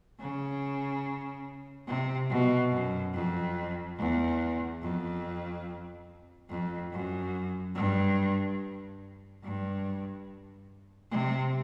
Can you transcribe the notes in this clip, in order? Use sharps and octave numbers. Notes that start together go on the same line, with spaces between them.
C#3
C3
B2
F#2
F2
E2
F2
F2
F#2
G2
G2
C3